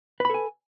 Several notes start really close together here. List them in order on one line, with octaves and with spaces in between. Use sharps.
B4 B5 A4 G#5